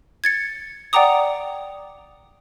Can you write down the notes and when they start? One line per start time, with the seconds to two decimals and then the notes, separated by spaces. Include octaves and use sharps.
0.24 G#6 A6 C#7
0.93 D5 F#5 G5 A#5 D6 D#6